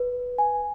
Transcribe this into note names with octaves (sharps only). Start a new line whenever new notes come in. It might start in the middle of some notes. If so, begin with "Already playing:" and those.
Already playing: B4
G#5